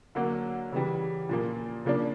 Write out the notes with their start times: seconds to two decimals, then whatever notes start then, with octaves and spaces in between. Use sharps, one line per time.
0.15 D3 F#3 A#3
0.73 C#3 E3 G3
1.29 A#2 F3 A#3
1.85 C#3 F3 A#3 D4